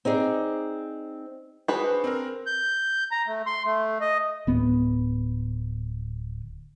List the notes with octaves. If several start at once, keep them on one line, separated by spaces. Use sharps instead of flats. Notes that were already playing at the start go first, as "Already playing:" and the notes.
C4 D#4 G#4 D5
D4 F#4 G#4 B4 C5
C4 A#4
G6
A#5
A3
C6
A3
D#5
D1 B3